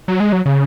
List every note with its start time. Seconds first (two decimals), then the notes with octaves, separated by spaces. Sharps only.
0.08 F#3
0.20 G#3
0.32 F#3
0.45 C#3